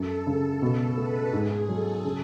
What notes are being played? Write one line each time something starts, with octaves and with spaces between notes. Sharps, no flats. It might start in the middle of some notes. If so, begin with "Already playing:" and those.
Already playing: F#2 A4
C#3
B2 A4
A3 B4
G#2 G#4
F#3 A4
C#3